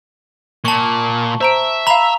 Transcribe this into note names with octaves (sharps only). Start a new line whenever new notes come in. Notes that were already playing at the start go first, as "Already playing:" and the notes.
A#2 A5 C#6
C5 E5 A#5 D7
F5 A#5 B5 F7